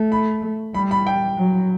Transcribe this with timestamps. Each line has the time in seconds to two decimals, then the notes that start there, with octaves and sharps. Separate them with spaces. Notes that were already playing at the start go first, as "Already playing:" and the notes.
Already playing: A3
0.12 B5
0.74 G3 B5
0.91 B5
1.07 G5
1.38 F#3